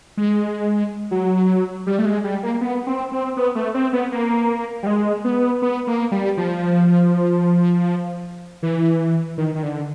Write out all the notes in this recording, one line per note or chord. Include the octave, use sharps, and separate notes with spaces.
G#3
F#3
G3
A3
G#3
G3
A#3
B3
C4
C4
B3
A3
C4
B3
A#3
G3
G#3
B3
B3
A#3
G3
F3
E3
D#3
D#3
D3